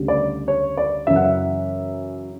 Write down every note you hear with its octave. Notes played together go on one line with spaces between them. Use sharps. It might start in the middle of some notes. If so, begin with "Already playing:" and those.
Already playing: D2 C#3 G3
D5
C#5
D5
F#2 C#3 E3 E5
F#5
E5